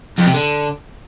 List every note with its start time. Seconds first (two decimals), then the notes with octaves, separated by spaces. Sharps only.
0.18 F2
0.26 C3
0.34 D3